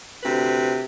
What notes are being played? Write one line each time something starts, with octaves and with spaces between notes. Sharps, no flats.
D2 C3 B4